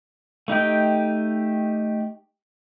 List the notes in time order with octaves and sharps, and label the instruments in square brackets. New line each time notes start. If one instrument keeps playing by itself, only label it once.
[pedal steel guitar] A3 D#4 G4 G5